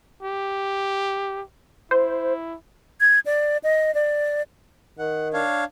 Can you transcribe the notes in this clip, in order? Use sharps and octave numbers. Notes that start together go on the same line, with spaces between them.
G4
E4 C5
G#6
D5
D#5
D5
D#3 F#5
D4 C#5 F5